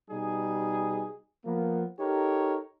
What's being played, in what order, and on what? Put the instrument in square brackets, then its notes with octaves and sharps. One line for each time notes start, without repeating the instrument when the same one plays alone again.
[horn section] B2 G3 D#4 G#4
F3 A#3 B3
D#4 G4 A4 A#4 C#5